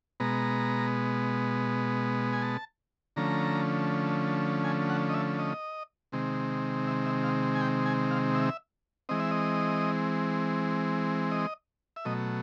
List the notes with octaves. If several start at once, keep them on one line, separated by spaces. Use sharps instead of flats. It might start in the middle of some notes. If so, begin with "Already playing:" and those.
B2 G#3 B3 A#5
G#5
A5
D3 F3 A3 C#4 A#5
G#5
F#5
D#5
E5
D#5
C3 D#3 G#3 C4
E5
E5
F5
G#5
G5
G#5
F5
E5
E3 G#3 C4 D#5
E5
D#5
D#5
E5
B2 F#3 A3 D#5